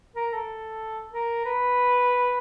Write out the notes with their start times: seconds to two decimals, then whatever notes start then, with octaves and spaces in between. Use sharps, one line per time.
0.16 A#4
0.33 A4
1.13 A#4
1.45 B4